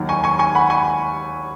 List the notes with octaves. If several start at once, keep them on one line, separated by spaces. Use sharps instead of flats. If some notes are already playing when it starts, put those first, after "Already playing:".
Already playing: D#2 D#3 F#3
G#5 C#6
G#5 C#6
G#5 C#6
F#5 B5
G#5 C#6